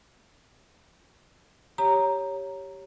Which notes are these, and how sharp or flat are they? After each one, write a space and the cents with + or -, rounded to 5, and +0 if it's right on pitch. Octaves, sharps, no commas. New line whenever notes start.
G4 +0 C#5 +0 A#5 +0